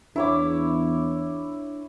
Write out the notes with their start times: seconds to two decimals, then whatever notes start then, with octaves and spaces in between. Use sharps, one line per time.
0.16 E2 D4 E4 C#5 D6